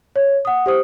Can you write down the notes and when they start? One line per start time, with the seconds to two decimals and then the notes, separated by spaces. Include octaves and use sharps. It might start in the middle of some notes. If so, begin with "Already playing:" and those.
0.16 C#5
0.45 F#5 D#6
0.66 G4 C5 D#6